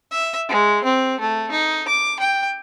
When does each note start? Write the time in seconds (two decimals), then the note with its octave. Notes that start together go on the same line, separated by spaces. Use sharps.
0.11 E5
0.49 G#3
0.84 C4
1.20 A3
1.51 D#4
1.88 D6
2.19 G5